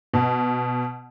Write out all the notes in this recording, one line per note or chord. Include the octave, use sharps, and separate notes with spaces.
B2